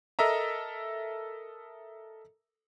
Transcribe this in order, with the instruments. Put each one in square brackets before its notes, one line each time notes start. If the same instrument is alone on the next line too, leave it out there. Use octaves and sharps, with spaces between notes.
[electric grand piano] A4 A#4 D#5 E5 A#5